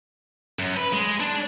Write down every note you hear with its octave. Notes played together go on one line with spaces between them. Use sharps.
F#2
B4
G#3
D4